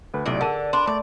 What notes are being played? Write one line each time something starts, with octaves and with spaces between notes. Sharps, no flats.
D2 A4 B4
B1 A2 C3 D5
D3 G#4 A#4 F#5 A5 D#7
D4 B5 C6
A3 D5